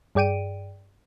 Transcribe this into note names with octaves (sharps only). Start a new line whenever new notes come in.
G2 G#4 D5 G5 D7 D#7